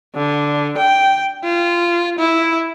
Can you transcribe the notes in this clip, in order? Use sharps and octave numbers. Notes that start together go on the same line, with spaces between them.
D3
G5
F4
E4